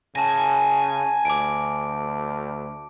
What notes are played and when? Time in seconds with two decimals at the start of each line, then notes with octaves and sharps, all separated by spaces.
0.16 C#3 G#5 A5 A#6
1.25 D2 D6 D7